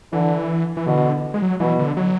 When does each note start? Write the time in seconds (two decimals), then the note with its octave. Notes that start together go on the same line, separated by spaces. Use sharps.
0.13 D3 E3
0.77 E3
0.86 B2 D3
1.34 G#3
1.42 F#3
1.60 B2 E3
1.79 D3
1.97 F#3